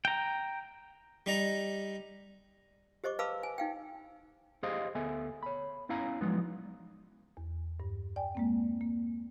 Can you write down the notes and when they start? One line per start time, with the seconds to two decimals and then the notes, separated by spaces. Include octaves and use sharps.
0.05 G5 A#5
1.26 G3 D#4 A#5
3.04 G4 C5 D#5 C#6 D6
3.19 B4 F5 A5 B5 D6 E6
3.43 G#5
3.58 D#4 F5 G5
4.63 G4 G#4 C5 D#5 F5
4.95 D2 B3 A4 E5 G#5
5.43 C#5 B5
5.89 B3 C#4 E4 F5 G#5 A#5
6.21 F3 F#3 G#3 B3 D#4
7.37 E2
7.80 G2
8.16 D5 G5 G#5
8.35 G#3 A#3 C4
8.81 A#3